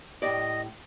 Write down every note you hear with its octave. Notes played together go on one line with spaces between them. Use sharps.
A2 G4 D5 D#5